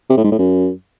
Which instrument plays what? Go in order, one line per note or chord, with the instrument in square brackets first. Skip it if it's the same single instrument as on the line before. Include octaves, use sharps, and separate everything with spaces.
[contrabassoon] C3
A2
G#2
A2
F#2